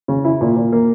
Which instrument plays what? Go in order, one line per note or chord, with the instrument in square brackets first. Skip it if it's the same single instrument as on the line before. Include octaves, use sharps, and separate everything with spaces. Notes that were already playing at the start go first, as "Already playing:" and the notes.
[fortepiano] C#3
E4
A#2
A#2
A#3